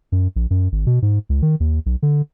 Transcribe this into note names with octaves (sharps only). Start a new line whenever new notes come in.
F#2
A#1
F#2
G#1
B2
G#2
C#2
D#3
D#2
B1
D3